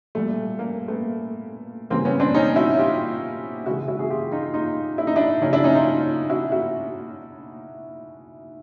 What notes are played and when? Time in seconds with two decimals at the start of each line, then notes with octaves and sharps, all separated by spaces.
0.15 A#2 G3 A3
0.59 A#3
0.88 A3 B3
1.90 C#3 E3 G3 A#3 C4
2.05 B3 C#4
2.20 C4 D4
2.34 C#4 D#4
2.56 E4 F#4
2.78 F4 G4
3.66 C#3 E3 G#3 E4 F#4
3.88 E4 F#4
3.99 F#4 G#4
4.10 F4 G4
4.32 D#4 F4
4.54 D#4 F4
4.98 E4
5.07 D#4
5.16 D4 E4
5.42 C#3 F#3 C#4 D#4
5.53 D4 E4
5.64 C#4 D#4
5.75 D#4 F4
6.30 E4 F#4
6.52 E4 F#4